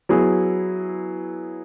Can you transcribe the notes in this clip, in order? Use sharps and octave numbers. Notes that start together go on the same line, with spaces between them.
F#3 B3 E4 G#4